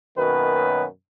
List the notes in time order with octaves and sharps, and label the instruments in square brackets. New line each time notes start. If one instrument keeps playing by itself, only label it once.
[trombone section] F#2 B2 D#3 F#3 A#3 B4